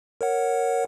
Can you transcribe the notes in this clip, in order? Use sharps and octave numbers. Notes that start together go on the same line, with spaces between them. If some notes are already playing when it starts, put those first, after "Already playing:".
A#4 C#5 F#5